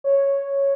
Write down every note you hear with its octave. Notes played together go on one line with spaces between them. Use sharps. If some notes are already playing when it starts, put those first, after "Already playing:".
C#5